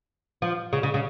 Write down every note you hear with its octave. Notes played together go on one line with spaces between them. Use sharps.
F3
C#3
C#3
C#3